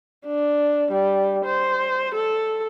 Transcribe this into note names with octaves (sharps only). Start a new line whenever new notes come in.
D4
G3
C5
A4